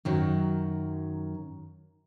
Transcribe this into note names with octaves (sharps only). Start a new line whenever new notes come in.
F#2 D#3 F#3